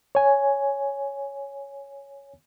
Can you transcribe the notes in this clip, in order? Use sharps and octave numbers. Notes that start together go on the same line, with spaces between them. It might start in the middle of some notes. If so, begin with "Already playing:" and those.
C#5 G#5